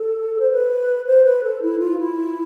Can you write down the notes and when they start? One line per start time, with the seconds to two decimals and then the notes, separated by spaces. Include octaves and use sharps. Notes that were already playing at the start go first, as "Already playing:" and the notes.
Already playing: A4
0.40 C5
0.52 B4
1.07 C5
1.24 B4
1.44 A4
1.62 E4
1.79 F4
1.98 E4